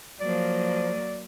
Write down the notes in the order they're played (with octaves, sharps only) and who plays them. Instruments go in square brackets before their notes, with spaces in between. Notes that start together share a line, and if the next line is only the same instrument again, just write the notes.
[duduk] F3 [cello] F#3 A#3 [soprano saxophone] D5